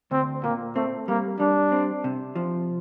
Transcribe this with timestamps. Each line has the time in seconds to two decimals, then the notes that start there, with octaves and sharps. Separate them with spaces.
0.11 D2 C4
0.43 A#2 A#3
0.76 A3 C4
1.08 G3 A#3
1.40 G3 D4
1.72 C4
2.04 C3
2.36 F3